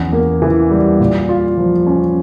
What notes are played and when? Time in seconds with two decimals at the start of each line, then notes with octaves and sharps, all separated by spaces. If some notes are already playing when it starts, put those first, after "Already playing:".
Already playing: E2 C#4
0.12 A#3
0.42 E3
0.71 G3
1.00 A#2
1.29 F4
1.58 F3
1.87 C#4